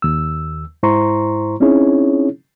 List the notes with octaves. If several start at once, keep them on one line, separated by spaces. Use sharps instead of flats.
D#2 E6
G#2 E4 C5 A#5 C6 C#6
C4 C#4 D#4 E4 G#4 C#5